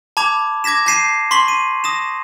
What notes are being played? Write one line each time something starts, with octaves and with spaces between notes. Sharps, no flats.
A5 B5 D6 G#6 F7
D6 G#6 A#6 B6 E7
A5 G6 B6 C7 D#7 E7
C6 C#6 B6 F#7
D#7
D#6 A#6 E7